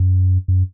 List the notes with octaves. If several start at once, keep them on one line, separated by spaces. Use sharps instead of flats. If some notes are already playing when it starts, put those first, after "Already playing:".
Already playing: F#2
F#2